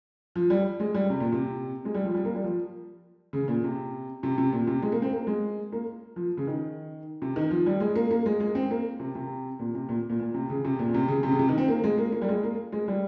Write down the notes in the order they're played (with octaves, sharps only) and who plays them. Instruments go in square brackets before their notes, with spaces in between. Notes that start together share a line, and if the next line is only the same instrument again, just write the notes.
[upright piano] F3
G3
G#3
G3
C3
A#2
C3
G#3
G3
F3
G3
A#3
G3
F3
C#3
A#2
C3
C3
C3
A#2
C3
G#3
A#3
C4
A#3
G#3
A#3
F3
C#3
D#3
C3
D#3
F3
G3
G#3
A#3
A#3
G#3
G#3
C4
A#3
C3
C3
A#2
C3
A#2
A#2
A#2
C3
C#3
C3
A#2
A#2
C3
C#3
C3
C#3
C3
D#3
C4
A#3
G#3
A#3
A#3
G3
G#3
A#3
G#3
G3